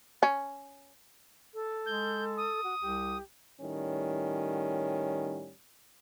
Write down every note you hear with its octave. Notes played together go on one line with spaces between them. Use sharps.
C#4
A4
G#3 G6
D#6
F#4
C2 G4
A2 D#3 G3 C#4